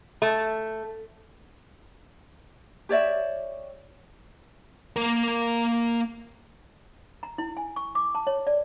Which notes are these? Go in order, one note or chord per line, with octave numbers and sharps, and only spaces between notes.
A3
G4 C#5 D5 E5
A#3 A#4
A#5
E4
G#5
C#6
D6
A5
C#5
D5